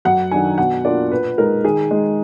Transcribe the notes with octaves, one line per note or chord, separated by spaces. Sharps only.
F#2 F#5
D#3 F#3 D4 G#5
B2 F#5
A#3 D4 F4 D5
A#2 B4
G#3 D#4 A#4
D#3 G#4
G#3 D#4